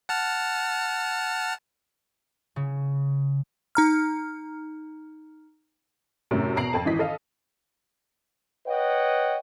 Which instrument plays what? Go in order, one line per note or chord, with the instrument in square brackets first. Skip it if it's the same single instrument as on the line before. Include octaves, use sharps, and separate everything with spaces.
[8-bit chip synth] F#5 A5 F6
[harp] C#3
[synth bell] D#4 A#5 F6
[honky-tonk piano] F#2 A2 C3
E2 B2 A#5 C7 D7 F#7
F2 A4 A5
G#1 E3 D#5 B6
A4 D#5 F5
[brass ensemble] B4 C#5 D#5 F#5 G5